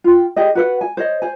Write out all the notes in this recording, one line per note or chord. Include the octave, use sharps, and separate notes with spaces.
F4 G5
G4 G#4 D#5
F#4 B4 F#5
G#5
C5 C#5 D#5
C5 G#5